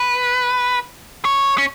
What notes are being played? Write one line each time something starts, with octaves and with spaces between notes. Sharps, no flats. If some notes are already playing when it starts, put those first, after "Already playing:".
Already playing: B4
C#5
C#4